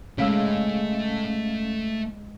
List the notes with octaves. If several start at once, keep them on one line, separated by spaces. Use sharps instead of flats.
C#3 G#3 A3 C#4 F5 B5 E6